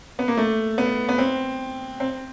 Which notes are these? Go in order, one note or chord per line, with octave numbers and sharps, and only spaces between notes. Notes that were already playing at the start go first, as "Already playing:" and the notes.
B3
A#3
A3
B3
B3
C4
C4